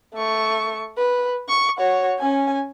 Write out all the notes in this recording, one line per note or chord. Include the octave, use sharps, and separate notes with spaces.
A3 C#6
B4
C#6
F#4 C#5
C#4 G#5